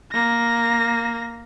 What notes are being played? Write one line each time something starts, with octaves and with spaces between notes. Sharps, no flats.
A#3 A#6